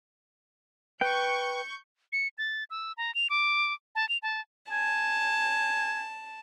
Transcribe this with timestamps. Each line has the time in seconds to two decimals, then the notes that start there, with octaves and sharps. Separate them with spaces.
1.01 B4 G5 C#6 G6
2.13 C#7
2.38 A6
2.70 E6
2.97 A#5
3.15 F7
3.30 D6
3.95 A5
4.09 F7
4.22 A5
4.71 G#5 A5